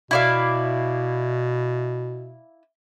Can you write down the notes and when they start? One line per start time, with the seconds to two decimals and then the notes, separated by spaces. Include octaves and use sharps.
0.11 B2 E4 D5 F5